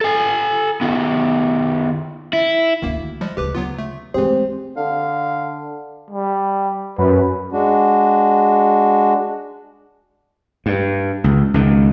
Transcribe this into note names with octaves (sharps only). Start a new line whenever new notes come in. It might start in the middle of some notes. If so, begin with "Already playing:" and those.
A4 G#5
D#3 B3
E4
D2 D#3 A#3 D4
F3 G3 G#3
D2 C#3 G4 B4 D6
F#3 B3 F4
A3
E3 G#3 A3 C4 G4 G#4 C5
D3 F5
G3
F#2 B4
G#3 D4 F#4
G2
C#2
C#2 D#3